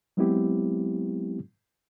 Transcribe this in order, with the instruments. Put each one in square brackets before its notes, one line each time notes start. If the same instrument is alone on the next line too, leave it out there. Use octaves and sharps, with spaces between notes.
[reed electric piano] F#3 G#3 B3 C4 E4 G4